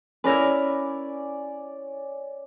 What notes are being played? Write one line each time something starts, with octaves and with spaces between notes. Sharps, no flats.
C#4 E4 A#4 B4 D5